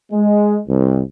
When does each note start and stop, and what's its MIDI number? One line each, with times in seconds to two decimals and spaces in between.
0.12 0.59 56
0.68 1.00 36